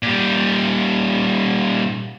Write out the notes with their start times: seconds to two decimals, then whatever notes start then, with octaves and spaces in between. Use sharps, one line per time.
0.03 A#2 G3